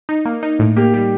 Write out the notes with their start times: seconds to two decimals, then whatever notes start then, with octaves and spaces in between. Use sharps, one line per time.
0.09 D#4
0.25 A#3
0.43 D#4
0.59 A2
0.76 A#3 G4
0.94 G3